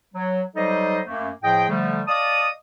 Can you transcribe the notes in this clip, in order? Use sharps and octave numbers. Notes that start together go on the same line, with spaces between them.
F#3
F#3 G3 D#4 A4 C5 D#5
F#2 A3 A#3
A2 F3 G#4 D#5 G5
D3 F3 G3 A3
D5 D#5 F5 A5 D#6